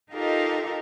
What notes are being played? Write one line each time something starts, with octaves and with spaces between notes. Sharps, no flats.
D#4 F4 G4 A4 A#4 D#5